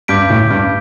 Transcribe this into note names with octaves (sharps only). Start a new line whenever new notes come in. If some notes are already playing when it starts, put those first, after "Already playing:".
G2 D6 G6 B6 D7
A2
G2